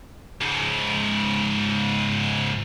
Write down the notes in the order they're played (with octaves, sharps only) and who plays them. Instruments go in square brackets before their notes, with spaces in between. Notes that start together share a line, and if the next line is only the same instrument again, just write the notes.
[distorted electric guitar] G#2 C#3